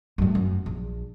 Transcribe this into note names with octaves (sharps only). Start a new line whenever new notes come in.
F#2 A2
F#2
A#1